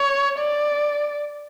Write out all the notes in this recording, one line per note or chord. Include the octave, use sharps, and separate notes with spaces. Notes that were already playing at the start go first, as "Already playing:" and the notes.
Already playing: C#5
D5